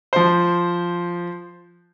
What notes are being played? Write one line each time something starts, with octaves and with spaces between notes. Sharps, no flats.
F3 C5